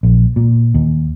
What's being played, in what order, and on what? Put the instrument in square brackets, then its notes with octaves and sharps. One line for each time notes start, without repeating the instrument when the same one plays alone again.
[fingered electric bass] A#1
A#2
D#2